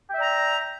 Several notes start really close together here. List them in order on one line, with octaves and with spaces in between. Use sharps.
G5 E5 D5 A#5